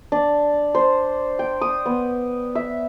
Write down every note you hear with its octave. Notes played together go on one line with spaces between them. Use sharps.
D4
C5
G5
D#6
B3
E5